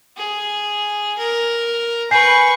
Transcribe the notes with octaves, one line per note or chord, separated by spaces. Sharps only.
G#4
A#4
B4 G#5 C#6 G6 C7